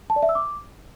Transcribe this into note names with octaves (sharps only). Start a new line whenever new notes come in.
A5
D5
E5
E6
D6